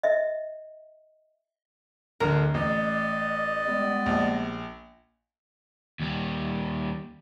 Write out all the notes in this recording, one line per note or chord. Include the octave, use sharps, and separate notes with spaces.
D#5 E5
D1 D3 A#4
A1 D5 D#5
G3 G#3 B3
A#1
D#2 G3